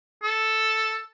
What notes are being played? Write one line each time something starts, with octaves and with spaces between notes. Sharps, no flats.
A4